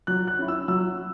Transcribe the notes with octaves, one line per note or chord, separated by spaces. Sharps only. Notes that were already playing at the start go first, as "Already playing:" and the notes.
F#3 F#6
F#6
C#4 E4
E6
F#3 E6